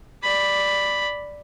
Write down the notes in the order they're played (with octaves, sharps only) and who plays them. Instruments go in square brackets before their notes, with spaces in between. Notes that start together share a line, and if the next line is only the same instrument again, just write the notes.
[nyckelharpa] D5 B5